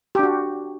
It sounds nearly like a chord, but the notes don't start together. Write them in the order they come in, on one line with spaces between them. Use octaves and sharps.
G4 D4 F#4